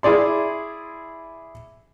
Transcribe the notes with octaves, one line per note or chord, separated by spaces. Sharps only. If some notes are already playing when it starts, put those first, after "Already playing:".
E4 G#4 D5 C6